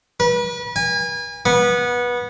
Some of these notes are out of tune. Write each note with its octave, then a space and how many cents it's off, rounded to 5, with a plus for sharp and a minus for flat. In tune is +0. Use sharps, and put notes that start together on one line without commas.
B4 -35
G#5 -30
B3 -20